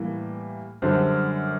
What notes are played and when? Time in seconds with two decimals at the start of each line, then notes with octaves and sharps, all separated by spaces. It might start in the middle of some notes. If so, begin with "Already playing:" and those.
Already playing: A2 E3 G3 A#3
0.82 F#2 D3 G3 C5